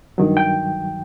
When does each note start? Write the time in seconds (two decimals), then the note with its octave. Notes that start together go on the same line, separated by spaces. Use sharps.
0.18 G2 D#3 F#3
0.37 G5